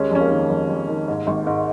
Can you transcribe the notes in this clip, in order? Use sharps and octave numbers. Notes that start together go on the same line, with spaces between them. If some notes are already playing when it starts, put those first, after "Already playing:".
Already playing: D#2 G#3 C#4
F2 C#4
A#3
D#3
F2
F2
D#3
G#2
G#1
G#2